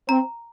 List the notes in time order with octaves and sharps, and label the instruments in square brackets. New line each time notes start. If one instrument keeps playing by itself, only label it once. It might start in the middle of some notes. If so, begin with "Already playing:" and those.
[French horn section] C4 [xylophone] A#5